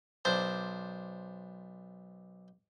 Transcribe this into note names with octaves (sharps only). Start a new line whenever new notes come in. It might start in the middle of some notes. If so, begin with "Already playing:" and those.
B1 D4 C5